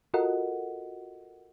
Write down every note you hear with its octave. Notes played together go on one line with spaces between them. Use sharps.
F4 F#4 A4 A#4 D#5 F#5